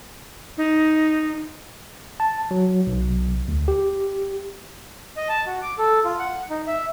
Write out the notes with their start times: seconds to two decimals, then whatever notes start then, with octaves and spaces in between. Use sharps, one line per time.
0.57 D#4
2.20 A5
2.51 F#3
2.87 B1
3.48 D2
3.68 G4
5.17 D#5
5.29 A5
5.47 F#4
5.62 D6
5.79 A4
6.05 F4
6.19 F#5
6.50 D#4
6.67 E5